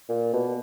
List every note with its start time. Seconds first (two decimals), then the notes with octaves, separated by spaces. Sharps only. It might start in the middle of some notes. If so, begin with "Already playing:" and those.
0.09 A#2
0.33 B2